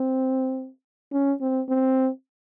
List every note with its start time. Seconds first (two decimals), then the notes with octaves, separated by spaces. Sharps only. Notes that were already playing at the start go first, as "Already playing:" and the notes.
Already playing: C4
1.13 C#4
1.41 C4
1.69 C4